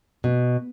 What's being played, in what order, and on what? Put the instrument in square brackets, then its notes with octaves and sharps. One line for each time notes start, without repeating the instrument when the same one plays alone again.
[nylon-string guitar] B2